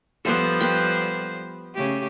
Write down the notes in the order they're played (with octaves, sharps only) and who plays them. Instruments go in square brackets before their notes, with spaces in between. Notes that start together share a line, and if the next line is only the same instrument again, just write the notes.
[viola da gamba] F3 G3 C5 [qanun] B3 A4
[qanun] B4 G5
[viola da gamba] C#3 A3 G4